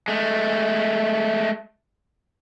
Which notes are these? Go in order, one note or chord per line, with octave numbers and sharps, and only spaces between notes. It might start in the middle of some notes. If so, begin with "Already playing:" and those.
G#3 A3